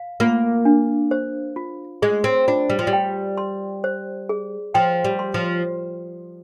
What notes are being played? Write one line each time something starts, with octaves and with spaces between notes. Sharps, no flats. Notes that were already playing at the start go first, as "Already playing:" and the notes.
Already playing: F5
A#3 F4
D4
C5
F4
G#3 G#4
C4
D4 F4
G3
F3
G3
G5
C6
C5
G#4
F3 G5
G3
C6
F3